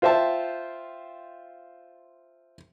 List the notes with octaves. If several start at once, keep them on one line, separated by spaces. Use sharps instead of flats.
F4 C5 E5 G5 A5